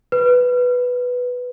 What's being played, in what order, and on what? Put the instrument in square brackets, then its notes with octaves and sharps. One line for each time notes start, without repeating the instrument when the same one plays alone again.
[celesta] B4